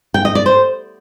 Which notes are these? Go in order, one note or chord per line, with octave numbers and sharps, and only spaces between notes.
G5
D#5
D5
C5